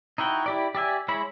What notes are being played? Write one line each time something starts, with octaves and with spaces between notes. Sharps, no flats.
D#4 E4 F#4 G5
E4 G4 D5
G4 D5 E5 G#5
G#3 E4 C#5 B5